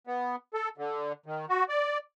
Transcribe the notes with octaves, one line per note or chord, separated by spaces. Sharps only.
B3
A4
D3
D#3
F#4
D5